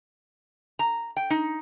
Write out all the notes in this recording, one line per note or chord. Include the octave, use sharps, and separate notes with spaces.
A#5
G5
D#4